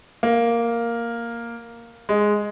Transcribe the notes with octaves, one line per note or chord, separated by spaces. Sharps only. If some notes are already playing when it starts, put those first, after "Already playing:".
A#3
G#3